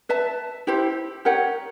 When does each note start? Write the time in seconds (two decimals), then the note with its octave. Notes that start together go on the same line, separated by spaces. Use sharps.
0.09 B4 E5 A5
0.67 E4 G4 C5
1.25 G4 A#4 C#5 F#5